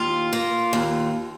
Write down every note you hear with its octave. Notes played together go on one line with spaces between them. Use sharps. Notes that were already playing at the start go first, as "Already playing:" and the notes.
Already playing: D#2 F4
A#3
D#2